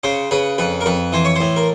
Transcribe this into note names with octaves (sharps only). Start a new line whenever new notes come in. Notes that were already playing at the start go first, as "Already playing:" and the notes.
C#3 C5
C#3 B4
F2 B4
A#4
F2 B4
E3 C5
C#5
A2 C5
A#4